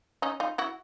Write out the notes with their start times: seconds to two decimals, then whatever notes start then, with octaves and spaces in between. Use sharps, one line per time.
0.22 C#4 D#4
0.40 D#4 F4
0.58 E4 F#4